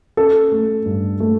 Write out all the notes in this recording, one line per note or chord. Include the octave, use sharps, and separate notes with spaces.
C#4 A4
A3
G2
A3